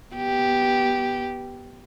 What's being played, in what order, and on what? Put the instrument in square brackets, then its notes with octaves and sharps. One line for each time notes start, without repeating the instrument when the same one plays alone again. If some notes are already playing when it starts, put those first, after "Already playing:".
[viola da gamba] B3 G4